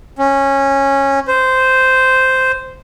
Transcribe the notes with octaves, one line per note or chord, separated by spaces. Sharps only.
C#4
C5